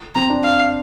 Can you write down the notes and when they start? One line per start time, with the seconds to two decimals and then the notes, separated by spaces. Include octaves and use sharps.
0.15 C4 A#5
0.30 D4
0.44 F5